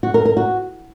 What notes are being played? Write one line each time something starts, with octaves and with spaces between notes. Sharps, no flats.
F#4
A#4
A#4
F#4